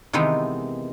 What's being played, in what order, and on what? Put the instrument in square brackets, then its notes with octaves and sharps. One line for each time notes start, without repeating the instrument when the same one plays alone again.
[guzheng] C3 D#3 E3 G#3 B3